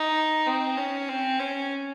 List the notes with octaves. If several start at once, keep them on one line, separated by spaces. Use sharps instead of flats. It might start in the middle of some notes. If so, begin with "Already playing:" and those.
Already playing: D#4
C4
C#4
C4
C#4